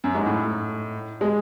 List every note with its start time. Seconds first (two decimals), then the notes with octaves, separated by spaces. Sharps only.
0.04 F#2
0.15 G#2
0.26 A2
1.21 G#3